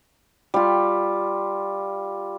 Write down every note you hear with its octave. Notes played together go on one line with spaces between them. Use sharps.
G3 F4